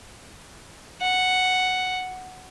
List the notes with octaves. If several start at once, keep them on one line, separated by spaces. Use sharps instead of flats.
F#5